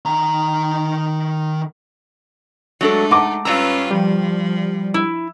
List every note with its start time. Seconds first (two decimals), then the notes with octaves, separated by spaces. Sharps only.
0.05 D#3 A#5
2.81 F#3 G#3 A3 D4 A4
3.11 D#4 F#5 A5 D6
3.45 G2 C#4 F4 B4 A#5 E6
3.91 F3 G3
4.94 E4 E6